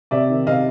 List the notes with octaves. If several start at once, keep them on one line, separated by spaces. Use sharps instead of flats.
C3 D5 E5
D#3
C3 D#5 F5